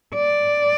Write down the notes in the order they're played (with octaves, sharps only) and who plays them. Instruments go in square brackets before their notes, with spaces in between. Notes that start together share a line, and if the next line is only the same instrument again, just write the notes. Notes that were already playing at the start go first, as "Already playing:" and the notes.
[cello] D5